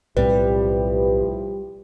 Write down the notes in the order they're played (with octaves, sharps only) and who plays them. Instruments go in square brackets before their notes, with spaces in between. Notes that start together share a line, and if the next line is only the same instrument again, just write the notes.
[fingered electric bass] B1 A2 C4 [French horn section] F3 E4 G4 [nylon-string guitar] G3 [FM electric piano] B4